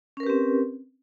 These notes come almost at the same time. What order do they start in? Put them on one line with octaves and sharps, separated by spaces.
C#4 A#4 B4 G4 C4